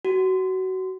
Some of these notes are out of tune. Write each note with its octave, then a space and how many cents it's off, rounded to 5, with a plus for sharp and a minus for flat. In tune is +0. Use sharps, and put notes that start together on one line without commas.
F#4 +25